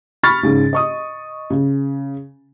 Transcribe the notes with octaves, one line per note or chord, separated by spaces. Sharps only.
B5 C#6 F6 A6
G#2 C#3
D#5 C#6 D#6
C#3